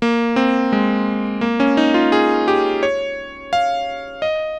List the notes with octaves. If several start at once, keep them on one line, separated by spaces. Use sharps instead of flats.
A#3
C4
G#3
A#3
C#4
D#4
F4
G#4
G4
C#5
F5
D#5